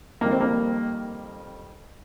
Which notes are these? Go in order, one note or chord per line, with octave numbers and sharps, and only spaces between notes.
F2 D#3 G3 A#3
C4
A#3